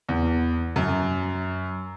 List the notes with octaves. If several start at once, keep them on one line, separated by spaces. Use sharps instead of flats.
E2
F#2